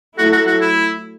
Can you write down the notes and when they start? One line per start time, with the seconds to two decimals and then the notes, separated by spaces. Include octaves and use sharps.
0.18 F#3 A3 E4 F#4 A4
0.32 F#4
0.47 F#4
0.61 E4